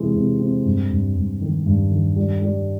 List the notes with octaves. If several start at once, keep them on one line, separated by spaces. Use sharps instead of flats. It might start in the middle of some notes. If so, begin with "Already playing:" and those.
Already playing: C3 E3 G#3
C3
C4
G2
G2
G2
D#3
G2
D#3
G3
G3